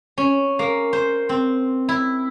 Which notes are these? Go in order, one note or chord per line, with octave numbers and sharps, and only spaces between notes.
C#4
A#3
C5
C4
E4